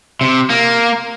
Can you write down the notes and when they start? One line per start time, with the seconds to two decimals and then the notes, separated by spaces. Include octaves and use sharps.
0.21 C3
0.50 A#3